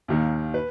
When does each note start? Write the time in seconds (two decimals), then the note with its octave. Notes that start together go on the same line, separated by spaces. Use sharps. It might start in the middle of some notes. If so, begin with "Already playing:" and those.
0.08 D#2 D#3 A#3
0.54 B4